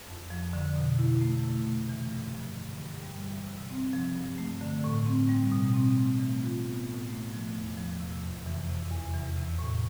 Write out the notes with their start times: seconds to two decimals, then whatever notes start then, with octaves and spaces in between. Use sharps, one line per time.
0.08 F2
0.30 F3
0.53 D3
0.76 B2
0.99 E4
1.21 A3
1.43 C3
1.66 A3
1.89 E3
2.12 G2
2.34 F3
2.57 D3
2.80 G2
3.02 G3
3.25 E3
3.48 C3
3.70 C4
3.93 F3
4.16 G2
4.38 A3
4.61 D3
4.84 A2
5.06 C4
5.29 G3
5.52 B2
5.74 C4
5.97 A3
6.19 E3
6.42 F4
6.65 B3
6.87 A2
7.10 A3
7.33 F3
7.55 E2
7.78 F3
8.00 C3
8.23 F2
8.46 E3
8.69 C3
8.91 E2
9.14 E3
9.37 C3
9.59 A2